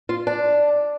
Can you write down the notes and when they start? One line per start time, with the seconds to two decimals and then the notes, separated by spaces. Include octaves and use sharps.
0.09 F4
0.27 D4